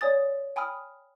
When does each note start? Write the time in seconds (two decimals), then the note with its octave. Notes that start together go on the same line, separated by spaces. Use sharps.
0.01 C#5 D5 G#5 D#6 A6
0.56 G5 G#5 B5 D#6 F6